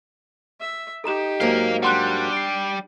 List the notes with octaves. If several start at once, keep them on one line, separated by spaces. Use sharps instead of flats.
E5
D#4 G4 A4 A#5 E7
G#2 F#3 A#3 A#4 F5
G3 D4 F#5 C6 F#6
C7 D7